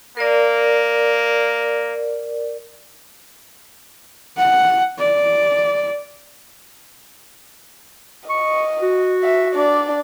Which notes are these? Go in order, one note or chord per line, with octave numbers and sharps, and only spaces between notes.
A#3 A#4 D5
F#5
D5
D#5 C#6
F#4
E5
D4 D5